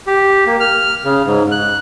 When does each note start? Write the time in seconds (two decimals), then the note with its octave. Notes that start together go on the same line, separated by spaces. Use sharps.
0.07 G4
0.46 A#3
0.60 F6
1.04 C#3
1.26 G#2
1.51 F#6